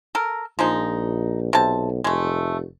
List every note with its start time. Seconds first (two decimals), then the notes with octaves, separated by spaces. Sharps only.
0.15 A4 A#4
0.59 A#1 F3 G#3 D#4
1.53 B1 C3 A5
2.04 F1 G#3 A3